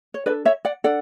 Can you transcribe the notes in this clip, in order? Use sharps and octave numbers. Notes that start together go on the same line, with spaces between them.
C#5
D4 A4 B4 D5
C#5 E5
D5 F#5
D4 A4 D5 F#5